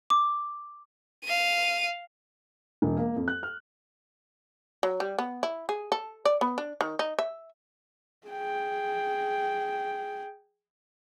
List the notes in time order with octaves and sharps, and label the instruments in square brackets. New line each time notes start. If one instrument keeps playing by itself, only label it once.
[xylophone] D6
[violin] F5 D#7
[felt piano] E1
A#3
F2
F#6
F6
[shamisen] F#3
G3
B3
E4
G#4
A4
D5
B3
D4
D#3
D#4
E5
[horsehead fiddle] G#4 G5